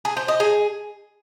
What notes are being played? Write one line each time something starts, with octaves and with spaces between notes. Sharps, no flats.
G#4
C5
D#5
G#4